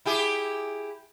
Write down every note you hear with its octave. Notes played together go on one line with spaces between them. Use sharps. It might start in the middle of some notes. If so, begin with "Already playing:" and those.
E4 G4 G#4